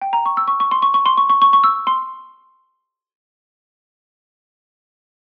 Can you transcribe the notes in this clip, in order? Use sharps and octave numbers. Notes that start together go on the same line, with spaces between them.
G5
A#5
C#6
E6
C#6
C#6
C6
C#6
C#6
C6
C#6
C#6
C#6
C#6
E6
C6